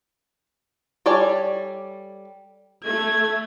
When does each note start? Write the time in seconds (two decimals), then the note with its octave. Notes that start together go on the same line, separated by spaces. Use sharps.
1.06 G3 A4 C#5 D5 G#5
2.84 A3 G#6